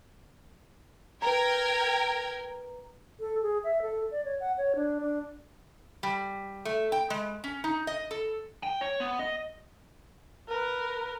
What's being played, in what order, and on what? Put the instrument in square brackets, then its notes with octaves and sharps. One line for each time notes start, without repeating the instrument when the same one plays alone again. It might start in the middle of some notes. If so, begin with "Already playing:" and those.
[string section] A#4 G5 G#6 [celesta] B4 A#5
[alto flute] A4
G#4
E5
A4
D5
C#5
F#5
C#5
D4
D4
[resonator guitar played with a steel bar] G3
A3
G5
G#3
C#4
D#4
D#5
A4
[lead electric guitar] G5
C#5
B3
D#5
[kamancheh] A#4 B4